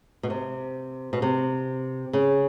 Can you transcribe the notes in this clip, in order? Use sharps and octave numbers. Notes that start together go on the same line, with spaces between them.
B2
C3
B2
C3
C#3